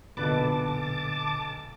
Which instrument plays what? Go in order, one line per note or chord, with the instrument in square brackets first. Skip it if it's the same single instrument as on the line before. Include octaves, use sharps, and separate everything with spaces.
[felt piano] B1 B4 [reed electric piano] A#2 D3 A4 [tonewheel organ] A5 D6